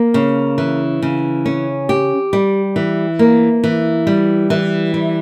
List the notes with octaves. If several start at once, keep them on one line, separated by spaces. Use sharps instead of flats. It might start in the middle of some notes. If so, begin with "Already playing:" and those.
Already playing: A#3
C#3
E3
C#3
C#4
G4
G3
E3
A#3
E3
G3
E3
G3